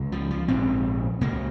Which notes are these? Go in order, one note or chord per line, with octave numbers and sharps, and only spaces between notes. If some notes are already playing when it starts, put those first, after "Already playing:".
Already playing: C#2 C#3
F3
F3
A#1 G#2 C4
C#2 C#3 A#3